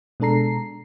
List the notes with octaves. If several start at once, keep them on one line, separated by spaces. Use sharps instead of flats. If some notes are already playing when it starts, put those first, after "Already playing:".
B2 G#3 D4 A4 A#5 C7